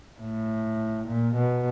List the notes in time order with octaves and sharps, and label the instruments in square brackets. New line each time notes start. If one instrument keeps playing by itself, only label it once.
[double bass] A2
A#2
B2